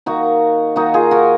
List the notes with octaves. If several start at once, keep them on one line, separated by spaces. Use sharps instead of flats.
D#3 A#3 D#4 F#4
D#3 A#3 D#4 F#4
F4 G#4
F#4 A#4